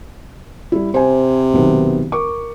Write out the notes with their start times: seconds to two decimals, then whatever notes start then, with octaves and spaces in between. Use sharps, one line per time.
0.72 G3 E4
0.94 C3 C5 G#5
1.53 B1 D#3 B3
2.12 A#4 C#6 D6